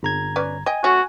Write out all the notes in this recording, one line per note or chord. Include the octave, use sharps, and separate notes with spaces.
G1 A#5 G#6
C#4 B4 D5
D#5 G5 G#5
F#3 A3 C#4 F#4